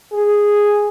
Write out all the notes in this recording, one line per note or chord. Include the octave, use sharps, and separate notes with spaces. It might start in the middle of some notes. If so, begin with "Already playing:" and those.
G#4